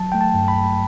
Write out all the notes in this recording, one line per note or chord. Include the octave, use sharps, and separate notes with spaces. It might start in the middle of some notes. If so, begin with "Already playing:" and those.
Already playing: F#3 A5
A3 G5
A5
G2
B5
A1